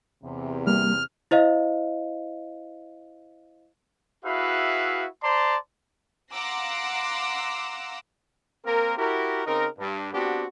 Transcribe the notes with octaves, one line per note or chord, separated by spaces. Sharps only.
E2 C3
G3 A#3 F6
E4 C5 D#5 F5
E4 F#4 G#4 B4 E5 F5
C5 D5 A5 A#5 C6
F5 F#5 A#5 C6 D6 E6
A#3 C4 A#4
E4 F#4 G4 A#4
C#3 C4 D#4 A#4
G2
B3 C4 D4 F#4 G4